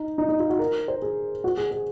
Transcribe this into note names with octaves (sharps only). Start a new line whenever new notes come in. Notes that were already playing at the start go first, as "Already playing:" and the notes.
Already playing: D#4
D#4
D#4
F4
F#4
A#4
C5
G#4
F#4
G#4
G#4